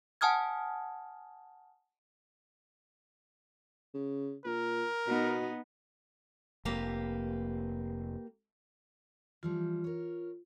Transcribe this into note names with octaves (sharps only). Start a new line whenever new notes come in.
F#5 G#5 A5 D#6 F6 G#6
C#3
A#2 A#4
B2 B3 D#4
F1 A#3 G4 B4
E3 F3 G3 F4
A#4 C#5